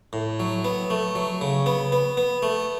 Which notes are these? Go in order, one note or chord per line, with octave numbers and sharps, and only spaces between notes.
A2
F#3
B3
A3
F#3
C#3
B3
B3
B3
A3